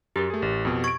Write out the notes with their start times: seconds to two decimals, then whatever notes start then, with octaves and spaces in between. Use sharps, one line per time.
0.16 F#2 G4 A#4 A6
0.30 A3 G#4
0.42 A1
0.65 F2 B2
0.84 C#6 G#6 D7